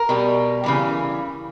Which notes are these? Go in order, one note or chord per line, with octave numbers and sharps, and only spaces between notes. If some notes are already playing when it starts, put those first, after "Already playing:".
Already playing: A#4
B2 G3
C#3 E3 G3